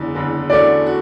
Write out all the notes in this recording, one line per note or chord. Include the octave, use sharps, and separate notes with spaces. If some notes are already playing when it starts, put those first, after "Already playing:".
Already playing: F#1 E2 D3
F#1 E2 D3
E2 D3 A3 C#4 F#4 D5
F#4